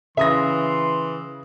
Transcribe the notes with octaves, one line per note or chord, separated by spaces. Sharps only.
C#3 E3 E5 C6 D#6 A#6